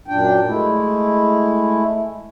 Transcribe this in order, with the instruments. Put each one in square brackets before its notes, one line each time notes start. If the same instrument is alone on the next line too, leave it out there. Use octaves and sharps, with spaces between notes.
[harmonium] F#2 A#2 D4 G5
G#3 A3 E4